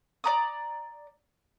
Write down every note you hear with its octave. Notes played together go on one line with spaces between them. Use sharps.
D5 A#5 D#6